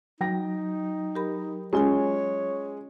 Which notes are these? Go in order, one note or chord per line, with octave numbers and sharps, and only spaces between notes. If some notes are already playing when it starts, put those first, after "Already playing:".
F#3 D#4 G5 A#6
G4 A#4 B5
G#3 C#4 F4 G#4 C#5 G#5